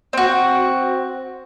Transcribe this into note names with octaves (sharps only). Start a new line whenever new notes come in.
C4 F#4